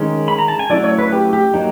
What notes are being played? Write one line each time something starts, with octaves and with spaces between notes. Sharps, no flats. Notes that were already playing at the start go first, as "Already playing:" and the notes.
Already playing: D#3 G#3 C#4
B5
A#5
A5
G#5
F#3 A3 C#4 E4 D5
C#5
B4
G4
G4
F#3 A#3 D#4